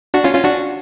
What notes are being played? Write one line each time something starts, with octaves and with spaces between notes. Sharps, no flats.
D4 F#4
C#4 F4
C#4 F4
D4 F#4